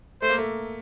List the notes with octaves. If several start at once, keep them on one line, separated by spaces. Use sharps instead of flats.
A3 C5
A#3
A3